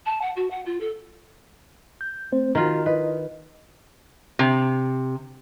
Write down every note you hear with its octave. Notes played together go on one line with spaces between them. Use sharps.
A5
F#5
F#4
F#5
F4
A4
G6
A3 C4 C5
D#3 F4 F#4 A#4 A#5
E4 B4 D#5
C3